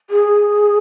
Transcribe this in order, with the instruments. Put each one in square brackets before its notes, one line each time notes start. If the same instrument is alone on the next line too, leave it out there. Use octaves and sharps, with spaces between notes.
[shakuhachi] G#4